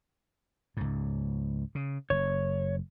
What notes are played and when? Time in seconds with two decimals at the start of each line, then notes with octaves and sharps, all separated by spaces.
0.77 C#2 G#2
1.75 C#3
2.10 F#1 C#5